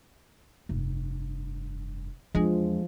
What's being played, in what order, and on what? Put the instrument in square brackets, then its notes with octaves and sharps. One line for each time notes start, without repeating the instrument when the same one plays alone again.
[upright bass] F1 G2
[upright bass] E2 D4 [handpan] F3 [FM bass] G#3